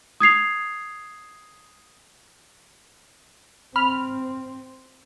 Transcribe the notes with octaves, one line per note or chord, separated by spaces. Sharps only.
D#6 G#6 C7 F7
C4 B5 F6